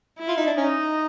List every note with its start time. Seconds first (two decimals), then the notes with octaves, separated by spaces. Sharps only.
0.19 E4
0.28 F4
0.37 D#4
0.47 D4
0.57 C#4 D#4